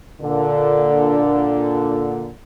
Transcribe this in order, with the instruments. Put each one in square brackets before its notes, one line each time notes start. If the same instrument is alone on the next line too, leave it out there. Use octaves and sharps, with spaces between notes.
[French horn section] A#2 D3